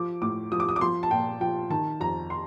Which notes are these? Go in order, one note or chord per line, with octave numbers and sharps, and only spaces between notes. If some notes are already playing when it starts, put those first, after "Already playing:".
Already playing: F3 D6
A2 D6
F3 D#6
D6
D#6
D6
F3 C6
A5
A#2 G5
F3 G5
D#3 A5
F2 A#5
C6